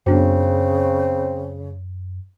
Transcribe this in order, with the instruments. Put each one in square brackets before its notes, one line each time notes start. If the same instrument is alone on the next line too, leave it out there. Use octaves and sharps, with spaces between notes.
[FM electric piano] F#2 [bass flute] C#3 [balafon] B3 D4 F#4 [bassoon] C4